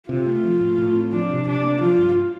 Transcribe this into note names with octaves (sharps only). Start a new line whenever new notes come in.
C3 F4
A3
F3
A2
A2
C4
F3 D4
C3
C3 D4
A#3
F3 F4
G2